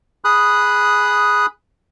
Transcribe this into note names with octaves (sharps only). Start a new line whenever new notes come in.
G#4 B5 D#6 F#6